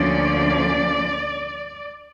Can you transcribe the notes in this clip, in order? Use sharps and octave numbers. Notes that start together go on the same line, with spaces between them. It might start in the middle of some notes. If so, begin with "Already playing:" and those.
Already playing: D2 D3 F3 A#3 C#4 D5